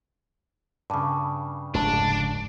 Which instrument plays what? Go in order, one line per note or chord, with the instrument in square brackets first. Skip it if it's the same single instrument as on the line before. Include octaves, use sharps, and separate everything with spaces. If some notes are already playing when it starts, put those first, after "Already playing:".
[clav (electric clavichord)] G2 C#3 [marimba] A5 D6
[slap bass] F1 C#2 [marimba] G#2 A5 [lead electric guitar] D4